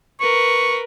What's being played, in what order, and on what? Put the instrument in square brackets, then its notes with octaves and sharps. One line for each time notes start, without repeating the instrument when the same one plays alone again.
[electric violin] A#4 B4 [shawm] C#6